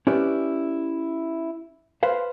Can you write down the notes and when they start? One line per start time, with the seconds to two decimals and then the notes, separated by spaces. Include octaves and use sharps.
0.07 C#4 E4 G4 B4 D5
2.03 B4 C5 F5